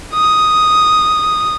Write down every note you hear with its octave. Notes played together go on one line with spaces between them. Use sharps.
D#6